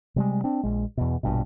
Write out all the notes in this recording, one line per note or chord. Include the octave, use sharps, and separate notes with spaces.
C3 G3 G#3
C4 D4
A#1 G#3
E2 B2
A#1 G2 B2